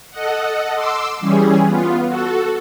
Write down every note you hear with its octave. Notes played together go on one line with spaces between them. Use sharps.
A4 D#5 F#5
C6 D6 E6
E3 G3 C#4 G#4
B3 F4
F#4 A4